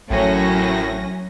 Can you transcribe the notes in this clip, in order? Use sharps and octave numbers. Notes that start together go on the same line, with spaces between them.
A1 F#2 A2 F#3 C#4 A#6